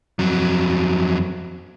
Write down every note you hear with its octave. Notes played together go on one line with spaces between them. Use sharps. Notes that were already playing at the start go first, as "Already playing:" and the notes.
F2 F#3